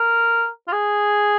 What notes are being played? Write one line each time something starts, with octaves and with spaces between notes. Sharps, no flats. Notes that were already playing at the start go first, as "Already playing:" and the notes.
Already playing: A#4
F4
G#4